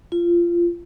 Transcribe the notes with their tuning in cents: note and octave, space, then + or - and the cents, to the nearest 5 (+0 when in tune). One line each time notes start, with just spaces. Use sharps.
F4 -20